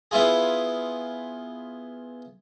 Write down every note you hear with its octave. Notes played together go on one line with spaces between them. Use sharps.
B3 E4 F4 G#4